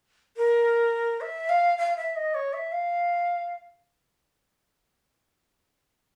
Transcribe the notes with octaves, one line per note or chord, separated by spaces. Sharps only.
A#4
E5
F5
F5
E5
D#5
C#5
E5
F5